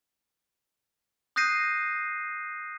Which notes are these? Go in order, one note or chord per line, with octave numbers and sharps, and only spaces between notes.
D#6 F#6 G6 A#6 C7 D#7